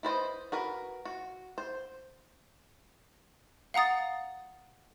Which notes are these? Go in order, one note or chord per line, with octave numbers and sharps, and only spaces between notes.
E4 B4 C5 D#5
F#4 A#4 B4
F#4
C5
F5 F#5 A#5 D#6 A6